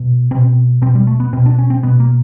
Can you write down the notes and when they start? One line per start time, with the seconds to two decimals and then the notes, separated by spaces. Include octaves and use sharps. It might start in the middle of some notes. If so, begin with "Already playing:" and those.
Already playing: B2
0.31 B2 C4
0.82 B2 C4
0.95 G3
1.07 A3
1.20 B3
1.33 B2 C4
1.46 D4
1.59 C#4
1.70 C4
1.83 B2 B3
2.00 A#3